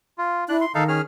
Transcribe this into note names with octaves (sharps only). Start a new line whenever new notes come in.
F4
D4 E4 F#6
C6
D#3 D#4 A4 F5
C#4 G#4 F6